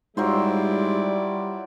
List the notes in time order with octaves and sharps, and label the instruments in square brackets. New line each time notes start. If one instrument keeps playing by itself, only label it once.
[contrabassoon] G#2 [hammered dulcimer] F#3 F4 C5 [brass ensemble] G3 [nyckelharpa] E4 D5